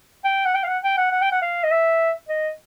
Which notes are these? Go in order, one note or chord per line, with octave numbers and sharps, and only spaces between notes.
G5
F#5
G5
F5
F#5
G5
F#5
F#5
G5
F#5
F5
D#5
E5
D#5